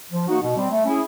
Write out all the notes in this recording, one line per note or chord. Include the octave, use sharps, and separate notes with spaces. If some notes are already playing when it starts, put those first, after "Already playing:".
F3
A#3 D#4 F#4
B2
G3 C4
A3
C#4 E4 G#4